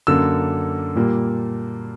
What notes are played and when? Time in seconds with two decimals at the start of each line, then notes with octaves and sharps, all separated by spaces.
0.07 F#2 D3 A#3 E6
0.96 A#2 G3 A#3